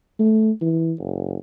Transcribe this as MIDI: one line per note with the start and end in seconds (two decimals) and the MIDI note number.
0.20 0.51 57
0.61 0.92 52
1.00 1.37 30